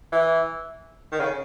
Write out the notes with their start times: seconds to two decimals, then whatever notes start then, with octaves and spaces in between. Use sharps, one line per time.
0.12 E3
1.12 D#3
1.20 C#3